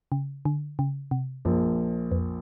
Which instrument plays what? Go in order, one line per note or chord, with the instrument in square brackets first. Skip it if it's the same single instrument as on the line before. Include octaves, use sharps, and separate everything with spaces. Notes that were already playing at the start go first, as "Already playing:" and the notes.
[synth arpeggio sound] C#3
D3
C#3
C3
[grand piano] A#1 A#2 F3 A#3 [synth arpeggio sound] F#2
[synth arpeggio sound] F2